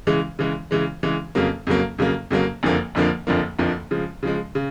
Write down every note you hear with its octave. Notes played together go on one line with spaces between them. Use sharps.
C#3 E3 G#3
C#3 E3 G#3
C#3 E3 G#3
C#3 E3 G#3
F2 C#3 F#3 A#3
F2 C#3 F#3 A#3
F2 C#3 F#3 A#3
F2 C#3 F#3 A#3
F#1 F2 D3 F3 A#3
F#1 F2 D3 F3 A#3
F#1 F2 D3 F3 A#3
F#1 F2 D3 F3 A#3
C#3 F3 G#3
C#3 F3 G#3
C#3